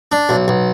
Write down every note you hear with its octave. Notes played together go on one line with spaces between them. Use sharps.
D4
B1
B1